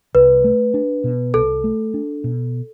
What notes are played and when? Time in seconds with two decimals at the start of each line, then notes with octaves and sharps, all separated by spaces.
0.15 C2 B4
0.44 A3
0.74 D4
1.04 B2
1.34 C2 A4
1.64 A3
1.94 D4
2.24 B2